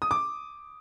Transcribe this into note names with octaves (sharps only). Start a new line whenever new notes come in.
D#6
D6